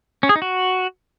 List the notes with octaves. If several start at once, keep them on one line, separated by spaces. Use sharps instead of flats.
C#4
G#4
D#4
F#4